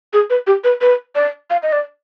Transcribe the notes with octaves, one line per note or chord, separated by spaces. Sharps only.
G#4
B4
G4
B4
B4
D5
F5
D#5
D5